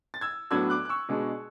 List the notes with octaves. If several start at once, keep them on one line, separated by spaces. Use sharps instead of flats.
A6
E6 G#6
A2 F#3 B3 D4 E6 G#6
D6 F#6
F#6
C#6 E6
B2 G#3 D4